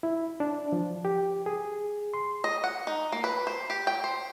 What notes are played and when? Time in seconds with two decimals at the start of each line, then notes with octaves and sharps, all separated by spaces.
0.03 E4
0.40 D4
0.72 F3
1.05 G4
1.46 G#4
2.14 C6
2.44 D#5
2.64 F#5
2.87 D#4
3.12 A#3
3.24 B4
3.47 C5
3.70 G4
3.87 G5
4.04 C5